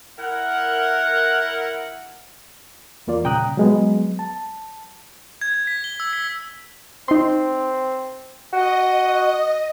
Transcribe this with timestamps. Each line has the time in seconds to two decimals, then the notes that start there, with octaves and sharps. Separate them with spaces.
0.19 E4 A#4 F#5
3.07 E2 A#3 F4 D5
3.24 A#2 C#3 G5 A#5 D#6 F#6
3.57 F#3 G#3 B3
4.19 A5
5.41 G#6
5.54 G#6
5.67 B6
5.84 G7
6.00 E6
6.13 B6
7.08 C4 D#4 C6
8.53 F#4 D#5